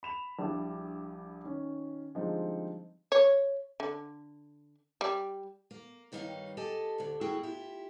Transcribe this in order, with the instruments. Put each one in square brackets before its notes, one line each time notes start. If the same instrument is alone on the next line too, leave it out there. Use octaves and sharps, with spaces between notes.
[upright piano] B5 E7 F7
A#1 G3 D4 E4
D#3 C#4
D3 F3 G3 G#3 C4 D#4
[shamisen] C#5
D3
G3
[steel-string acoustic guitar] A#3
G2 D#3 G3 D#4 C#5 F5
G4 A4 D#5 G#5 A5
D2 D3
E2 A3 E4 F#4 G#4 G5
E4 F4 G4